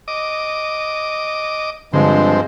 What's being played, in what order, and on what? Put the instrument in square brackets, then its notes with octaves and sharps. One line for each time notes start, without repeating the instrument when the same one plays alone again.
[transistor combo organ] D#5 D6
[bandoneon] G2 F3 G#3 [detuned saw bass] D3 [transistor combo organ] C4